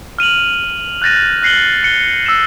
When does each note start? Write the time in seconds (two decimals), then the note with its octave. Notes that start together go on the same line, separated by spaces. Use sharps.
0.19 F6 D#7 F7 F#7
1.02 F#6 G6 A6 A#6 D#7
1.42 F#6 A#6 C7 C#7 F#7 G7
1.83 F#6 C#7 G7
2.26 E6 E7